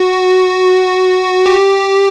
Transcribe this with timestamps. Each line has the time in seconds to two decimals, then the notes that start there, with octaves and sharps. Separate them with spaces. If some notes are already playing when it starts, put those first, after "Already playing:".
Already playing: F#4
1.46 G4